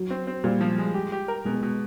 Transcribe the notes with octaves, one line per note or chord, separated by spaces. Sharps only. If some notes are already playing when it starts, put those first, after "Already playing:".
Already playing: F#3
C4
C4
A#2 G3
F3
G#3
G4
G4
A#4
B2 G#3
B2